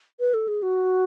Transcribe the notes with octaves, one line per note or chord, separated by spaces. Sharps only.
B4
A4
G#4
F#4